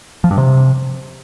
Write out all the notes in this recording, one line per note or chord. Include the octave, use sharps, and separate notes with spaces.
F3
G2
C3